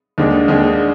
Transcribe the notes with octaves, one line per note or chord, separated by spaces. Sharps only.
D#2 D3 G#3 D4
D#2 D3 G#3 D4